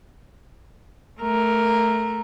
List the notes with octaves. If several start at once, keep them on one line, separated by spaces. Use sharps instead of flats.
A3 A#4